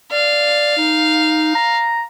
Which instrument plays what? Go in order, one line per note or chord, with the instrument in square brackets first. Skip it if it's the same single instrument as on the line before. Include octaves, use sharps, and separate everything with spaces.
[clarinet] D5 [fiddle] F5
[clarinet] D#4
A#5